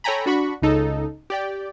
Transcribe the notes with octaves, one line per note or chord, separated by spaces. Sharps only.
A4 C#5 G5 G#5 A#5 B5
D4 F#4 B5 C#6
C#2 C#3 D#4 A4
G4 D5 G5